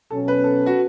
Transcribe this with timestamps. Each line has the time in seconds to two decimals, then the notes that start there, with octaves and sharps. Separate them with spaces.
0.10 B2 F#3 C#4 A4
0.28 B4
0.44 A4
0.66 F#4